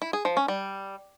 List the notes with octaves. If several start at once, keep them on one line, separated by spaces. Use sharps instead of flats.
E4
G#4
F3
C#4
G3